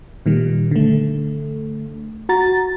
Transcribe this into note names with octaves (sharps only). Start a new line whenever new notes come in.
A#2 D#3 G3
D3 A3
F#4 A#5 A6